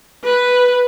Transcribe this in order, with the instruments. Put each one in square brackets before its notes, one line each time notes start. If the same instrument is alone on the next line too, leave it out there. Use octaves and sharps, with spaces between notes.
[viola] B4